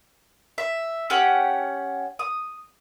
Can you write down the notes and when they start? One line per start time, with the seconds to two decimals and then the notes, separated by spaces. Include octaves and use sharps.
0.58 E5
1.10 C#4 G4 F#5 G5
2.19 D#6